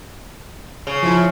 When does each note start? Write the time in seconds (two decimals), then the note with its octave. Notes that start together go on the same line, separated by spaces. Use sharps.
0.87 C#3
1.03 F3 E4